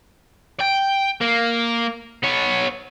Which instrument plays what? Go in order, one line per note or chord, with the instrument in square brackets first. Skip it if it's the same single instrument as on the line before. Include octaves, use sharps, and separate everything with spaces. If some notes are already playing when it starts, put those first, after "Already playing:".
[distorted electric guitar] G5
A#3
B3 C#5